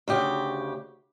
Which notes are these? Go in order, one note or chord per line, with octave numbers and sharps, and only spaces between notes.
D2 C#3 G4